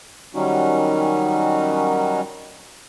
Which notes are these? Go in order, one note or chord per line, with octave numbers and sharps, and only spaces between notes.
D#3 F#3 G3 C#4 D#4 F#4